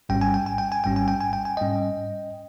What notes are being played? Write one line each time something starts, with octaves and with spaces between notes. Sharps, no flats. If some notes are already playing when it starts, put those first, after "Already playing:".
G#1 G#2 G3 C#4 G5
G#5
G5
G#5
G5
G#5
G#1 G#2 G3 C#4 G5
G#5
G5
G#5
G5
G#5
G#2 G3 C#4 D#5 G5